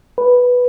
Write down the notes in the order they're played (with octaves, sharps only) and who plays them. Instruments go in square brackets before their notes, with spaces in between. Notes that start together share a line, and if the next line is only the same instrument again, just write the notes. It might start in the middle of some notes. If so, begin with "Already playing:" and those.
[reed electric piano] B4